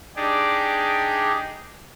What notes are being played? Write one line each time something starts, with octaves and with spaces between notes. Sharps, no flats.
D4 D#4 G4 G#4 D5